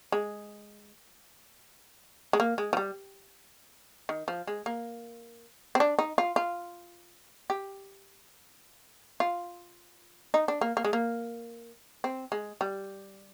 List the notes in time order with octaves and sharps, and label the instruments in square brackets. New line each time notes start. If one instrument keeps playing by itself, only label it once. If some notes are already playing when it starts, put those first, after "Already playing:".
[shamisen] G#3
G#3
A#3
G#3
F3
G3
D#3
F3
G#3
A#3
C4
D4
D#4
F4
F4
G4
F4
D#4
D4
A#3
A#3
G#3
A#3
C4
G#3
G3